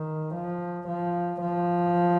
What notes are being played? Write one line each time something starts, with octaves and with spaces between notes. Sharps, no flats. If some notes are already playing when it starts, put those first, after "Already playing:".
Already playing: D#3
F3
F3
F3